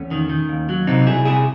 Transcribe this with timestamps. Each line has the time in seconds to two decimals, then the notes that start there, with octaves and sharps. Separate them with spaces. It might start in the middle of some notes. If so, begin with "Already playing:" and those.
Already playing: E2 A3 C#4
0.11 D#3
0.30 D#3
0.49 D#2
0.69 F#3
0.87 C3 C4 D#4
1.06 C2 E4 G#4
1.25 C3 E4 G#4